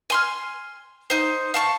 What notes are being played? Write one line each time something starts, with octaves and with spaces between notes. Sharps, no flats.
G#5 C6 F6
D#4 C5
F5 A5 C#6